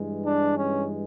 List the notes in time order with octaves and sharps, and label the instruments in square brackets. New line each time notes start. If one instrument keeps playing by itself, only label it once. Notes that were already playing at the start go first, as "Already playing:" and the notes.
Already playing: [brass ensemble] G2 E3 G#3
D4
C#4